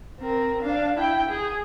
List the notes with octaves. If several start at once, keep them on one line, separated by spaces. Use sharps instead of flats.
C4 A#4
D4 F5
E4 G5
G#4